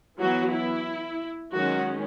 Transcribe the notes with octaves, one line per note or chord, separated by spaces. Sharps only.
E3 F#3 B3 F#4
E4
D#3 F#3 G#3 C#4 F#4